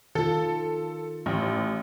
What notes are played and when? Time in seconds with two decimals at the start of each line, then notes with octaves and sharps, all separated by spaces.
0.15 D#3 F4 A4
1.26 A1